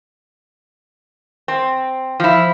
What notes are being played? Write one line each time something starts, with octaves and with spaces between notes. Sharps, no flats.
C4
F3 E4